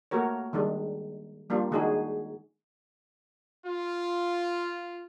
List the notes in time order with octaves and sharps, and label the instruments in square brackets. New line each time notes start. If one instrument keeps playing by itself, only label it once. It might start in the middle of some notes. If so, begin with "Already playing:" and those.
[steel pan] A3 A#3 F#4 A#4 C#5
D#3 G3 G#3 D4
G3 A#3 D4 F4
D#3 G#3 D4 D#4 F#4 G#4
[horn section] F4